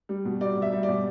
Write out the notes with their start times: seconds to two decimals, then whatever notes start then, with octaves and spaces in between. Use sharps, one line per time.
0.09 G3
0.25 B2
0.41 G3 D5
0.57 B2
0.62 E5
0.72 G3
0.83 D5
0.88 B2